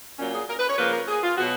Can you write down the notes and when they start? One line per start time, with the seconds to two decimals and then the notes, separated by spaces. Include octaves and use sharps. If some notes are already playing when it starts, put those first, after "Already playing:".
0.19 A#2 F#3 A#3 C#4
0.33 G#4
0.48 A#4
0.59 B4
0.69 C#5
0.78 C#3 F3 A#3 B4
0.93 A#4
1.08 G#4
1.23 F4
1.37 B2 F#3 B3 F#4